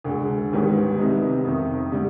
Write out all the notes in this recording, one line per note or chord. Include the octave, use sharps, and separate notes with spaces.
D2 D3 G#3
G#1 G#2 D#3 G3 B3
C2 C3 G3 B3 D#4
F2 C3 D#3
D3 G3 D4